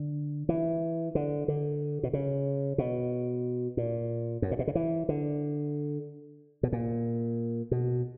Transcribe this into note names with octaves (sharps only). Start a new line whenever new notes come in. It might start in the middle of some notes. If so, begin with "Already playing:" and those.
Already playing: D3
E3
D3
D3
B2
C#3
B2
A#2
F#2
A#2
B2
C#3
E3
D3
B2
A#2
B2